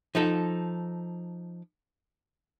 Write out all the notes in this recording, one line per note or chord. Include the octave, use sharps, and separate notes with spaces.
F3 D#4 A4